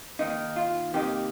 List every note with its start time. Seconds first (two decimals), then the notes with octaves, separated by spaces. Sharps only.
0.19 D#2 D#3 A#3 D#4
0.56 F4
0.94 C3 D#3 A#3 D#4 G4